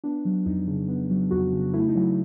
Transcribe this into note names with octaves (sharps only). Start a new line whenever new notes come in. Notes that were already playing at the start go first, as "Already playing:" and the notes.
B3 D4
F#3
F2 D#4
C#3
B3
F#3
F2 F#4
C#3
A3 E4
D#4
F#3